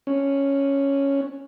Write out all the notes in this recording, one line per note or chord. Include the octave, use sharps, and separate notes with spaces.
C#4